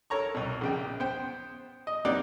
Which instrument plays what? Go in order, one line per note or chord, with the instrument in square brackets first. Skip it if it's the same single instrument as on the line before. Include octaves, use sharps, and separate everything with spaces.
[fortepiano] A4 A#4 C#5 A#5 C#6
C2 B2
A#1 C#3 G5
B3 C5 G5
D#5
A#3 C4 D#4 G4 D5 F#5